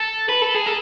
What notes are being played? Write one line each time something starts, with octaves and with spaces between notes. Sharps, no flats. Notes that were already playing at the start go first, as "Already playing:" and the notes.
Already playing: A4
B4
A4
G#4
A4